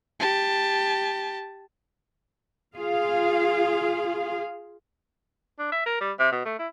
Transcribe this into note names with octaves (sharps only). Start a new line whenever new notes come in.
G4 A5
F4 G#4 F5
D4
E5
A#4
G3
C3
B2
A3
E4